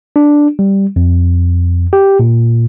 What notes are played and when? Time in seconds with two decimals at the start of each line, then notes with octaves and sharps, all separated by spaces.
0.16 D4
0.59 G3
0.96 F2
1.93 G4
2.20 A#2